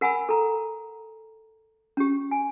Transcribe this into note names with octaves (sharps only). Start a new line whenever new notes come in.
A#4 F#5 G#5 B5 E6
A4 A#5
C#4 G4
G#5